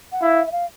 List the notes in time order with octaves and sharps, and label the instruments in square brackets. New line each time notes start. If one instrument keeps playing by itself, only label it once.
[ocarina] F#5
[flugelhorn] E4 [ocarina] F5
[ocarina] E5
F5